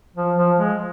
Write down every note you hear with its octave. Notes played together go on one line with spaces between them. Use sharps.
F3
F3
G#3